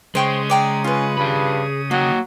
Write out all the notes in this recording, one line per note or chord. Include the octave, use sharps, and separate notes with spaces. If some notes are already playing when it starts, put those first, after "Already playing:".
C#3 G#3 C5 G5 C#6 D#6
D5 G5 A#5
C#4 F4 B4
G2 G#4 B5
F#3 A#3 D#5 G5